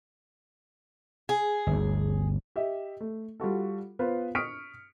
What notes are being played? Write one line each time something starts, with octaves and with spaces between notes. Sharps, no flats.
G#4
G1 D2
G4 D#5 E5
A3
G3 F4 F#4 A4
B3 F4 B4 C5
C#6 D#6 F6 B6 C#7 D7